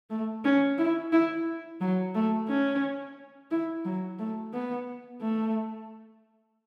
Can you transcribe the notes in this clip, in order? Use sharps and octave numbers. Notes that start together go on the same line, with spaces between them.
A3
C#4
E4
E4
F#3
A3
C#4
E4
F#3
A3
B3
A3